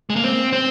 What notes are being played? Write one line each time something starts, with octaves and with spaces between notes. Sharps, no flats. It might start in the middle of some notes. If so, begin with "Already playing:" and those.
G#3
A#3
C4
C4